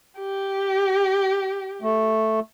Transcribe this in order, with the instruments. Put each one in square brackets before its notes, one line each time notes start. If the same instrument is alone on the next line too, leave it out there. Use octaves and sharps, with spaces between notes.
[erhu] G4
[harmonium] A3